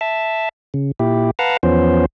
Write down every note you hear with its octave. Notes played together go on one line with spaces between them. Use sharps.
E5 A5
C#3
A#2 E4 G4
B4 F5 F#5 A5 A#5
E2 F3 B3 C#4 C5